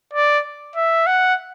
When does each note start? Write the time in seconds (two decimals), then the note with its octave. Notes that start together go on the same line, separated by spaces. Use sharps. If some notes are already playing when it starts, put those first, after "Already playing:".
0.13 D5
0.76 E5
1.07 F#5